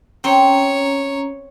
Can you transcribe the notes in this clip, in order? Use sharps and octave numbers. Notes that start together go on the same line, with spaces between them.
C4 C#4 C#5 A#5 C6